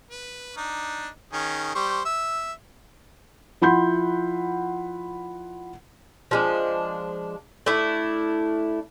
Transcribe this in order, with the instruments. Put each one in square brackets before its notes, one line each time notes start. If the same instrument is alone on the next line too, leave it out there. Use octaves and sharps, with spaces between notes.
[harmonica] B4
D4 D#4
D#3 C#4 G#4
G3 C5 C#6
E5
[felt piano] F3 E4 F#5 B5 C6 G6
[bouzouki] F3 G#3 D4
A3 D4 E4